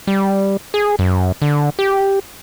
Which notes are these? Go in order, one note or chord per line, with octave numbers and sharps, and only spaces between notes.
G3
G#4
F#2
D3
G4